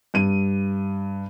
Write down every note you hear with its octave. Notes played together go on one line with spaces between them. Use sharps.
G2 D#7